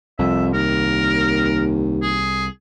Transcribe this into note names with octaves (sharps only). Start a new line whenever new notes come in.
C2 F2 E5
D#2 A#4
G#4